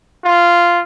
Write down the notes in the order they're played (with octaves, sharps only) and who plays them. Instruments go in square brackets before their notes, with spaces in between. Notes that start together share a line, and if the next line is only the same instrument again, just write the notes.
[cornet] F4